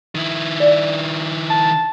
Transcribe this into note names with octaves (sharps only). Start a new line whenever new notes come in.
D#3 E4
D5
A5